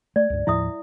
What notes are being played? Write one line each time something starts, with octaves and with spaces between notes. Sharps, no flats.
A3 D5
C#2 G2
D#2 A2 F3 E4 E5 D#6